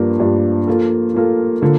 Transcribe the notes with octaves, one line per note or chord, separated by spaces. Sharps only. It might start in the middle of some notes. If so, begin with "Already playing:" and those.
Already playing: G2 F3 A#3 D4
G2 F3 A#3 D4
F3 A#3 F4 A4
F3 A#3 F4 A4
D3 F3 A#3